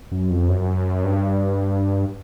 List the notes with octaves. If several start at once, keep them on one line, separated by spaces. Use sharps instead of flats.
F#2
F2
F#2
G2